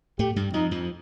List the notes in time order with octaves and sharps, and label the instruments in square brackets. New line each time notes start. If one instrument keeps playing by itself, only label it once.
[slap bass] A2 A3 [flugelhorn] G4
[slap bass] G2 G3
[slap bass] F2 F3 [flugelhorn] D#4
[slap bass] F2 F3